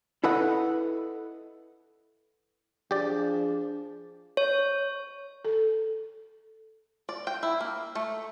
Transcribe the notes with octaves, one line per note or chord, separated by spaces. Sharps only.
E4 A4 B4 D#5 F#5
F3 D4 G4 G#4 D5
C#5
A4
D5
G5
E4
A#3
A3